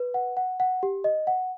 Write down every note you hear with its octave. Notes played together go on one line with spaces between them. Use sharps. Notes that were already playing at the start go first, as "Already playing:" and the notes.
Already playing: B4
F#5
F#5
F#5
G4
D#5
F#5